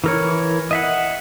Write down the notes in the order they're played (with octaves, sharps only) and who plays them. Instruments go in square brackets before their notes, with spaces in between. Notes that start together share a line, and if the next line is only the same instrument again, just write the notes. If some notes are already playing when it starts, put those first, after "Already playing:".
[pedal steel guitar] E3 A#4 C#5
D#5 E5 F#5